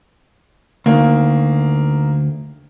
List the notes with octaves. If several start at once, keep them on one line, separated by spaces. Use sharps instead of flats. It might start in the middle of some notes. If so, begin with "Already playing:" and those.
D2 D#3 A#3